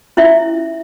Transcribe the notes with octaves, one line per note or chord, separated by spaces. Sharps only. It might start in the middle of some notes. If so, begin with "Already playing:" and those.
C#4 E4 E5